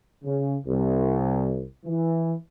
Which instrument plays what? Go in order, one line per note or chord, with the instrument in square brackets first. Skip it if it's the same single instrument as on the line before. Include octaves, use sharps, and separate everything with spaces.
[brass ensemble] C#3
C2
E3